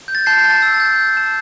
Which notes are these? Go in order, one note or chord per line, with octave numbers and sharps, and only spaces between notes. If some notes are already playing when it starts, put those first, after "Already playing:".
G6
A6
A5 G6 C7
A5
A6
E6
A6
G6
G6
A5